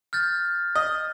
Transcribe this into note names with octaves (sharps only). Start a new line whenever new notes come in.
F6 G6 A6
D#5